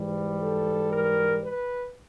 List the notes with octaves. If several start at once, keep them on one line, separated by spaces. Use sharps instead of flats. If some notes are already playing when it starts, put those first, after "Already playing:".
Already playing: G#2 E3 G3
A4
A#4
B4